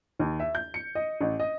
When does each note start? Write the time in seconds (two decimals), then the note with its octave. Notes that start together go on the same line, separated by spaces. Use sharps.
0.19 D#2
0.40 E5
0.55 G6
0.74 C#7
0.95 D#5
1.21 A1
1.40 D#5